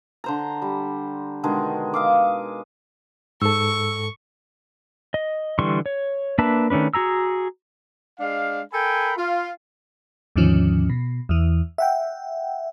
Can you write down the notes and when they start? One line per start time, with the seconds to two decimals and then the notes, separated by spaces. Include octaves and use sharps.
0.24 D3 C5 A#5
0.62 G3
1.43 B2 D3 D#3 G#3
1.94 D#5 F5 D6
3.42 G#2 A4 C#6 E6
5.14 D#5
5.59 D3 E3 G3 C6 C#6
5.86 C#5
6.38 A#3 D4 B4 E5 A5
6.70 D#3 A3 C#4 D4 B4
6.94 F#4 G#4 A#5 E6
8.20 G#3 D4 F5
8.73 A4 A#4 G5 G#5 B5
9.17 F4
10.36 D#2 G#2 D3 D#3 F3 C#4
10.89 B2
11.29 E2 E3
11.78 E5 F#5 G5